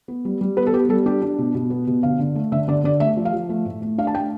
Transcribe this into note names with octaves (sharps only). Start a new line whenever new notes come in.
B3
G3
G3
B3 B4
A4
B3 G4
G3 A4
D4 G4
D4
B2
B2
B3
B2
D3 F5
D3
A3
D3 E5
D3 D5
D3 D5
A3 E5
F3
F5
F3
A3
A2
A3
D4 F5
A5
A3 G5